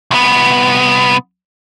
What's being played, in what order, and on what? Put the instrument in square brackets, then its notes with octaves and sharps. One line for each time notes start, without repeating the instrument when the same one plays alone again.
[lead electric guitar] C2 B3